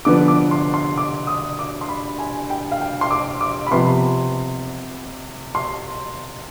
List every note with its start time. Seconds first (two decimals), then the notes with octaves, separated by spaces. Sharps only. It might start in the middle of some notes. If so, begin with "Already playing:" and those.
0.05 D3 F3 B3 D6
0.28 D6
0.51 C6
0.74 C6
0.97 D6
1.27 D#6
1.59 D6
1.81 C6
1.89 B5
2.19 G#5
2.50 G5
2.71 F5
2.81 G5
3.01 C6
3.11 D6
3.41 D6
3.67 B5
3.71 C3 F3 B3 C6
5.55 C6